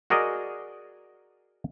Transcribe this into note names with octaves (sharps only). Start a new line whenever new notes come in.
F#4 G#4 A#4 D5 D#5